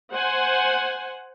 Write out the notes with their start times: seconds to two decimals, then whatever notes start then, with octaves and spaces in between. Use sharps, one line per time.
0.13 C5 F#5 G#5